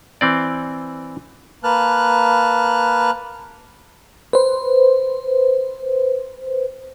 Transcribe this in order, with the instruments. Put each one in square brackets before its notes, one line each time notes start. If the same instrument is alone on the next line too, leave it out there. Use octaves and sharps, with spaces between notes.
[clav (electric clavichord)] E3 C4 D5
[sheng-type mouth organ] A#3 B4 A5 F6 F#6
[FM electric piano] B4 C5